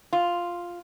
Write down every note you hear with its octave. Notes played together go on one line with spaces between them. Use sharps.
F4